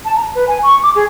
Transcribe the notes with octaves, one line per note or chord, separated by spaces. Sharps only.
A5
A#5
B4
G#5
C#6
D6
G#4